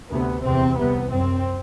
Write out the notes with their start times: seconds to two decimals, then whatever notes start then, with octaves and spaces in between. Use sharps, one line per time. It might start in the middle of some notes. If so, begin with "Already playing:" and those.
0.10 D2 C3 B3
0.44 E2 C3 C4
0.77 C2 C3 B3
1.11 F#2 C4